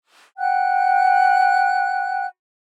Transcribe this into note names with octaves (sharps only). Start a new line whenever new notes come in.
F#5 G5 F#6